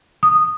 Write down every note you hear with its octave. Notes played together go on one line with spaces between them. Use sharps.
D#6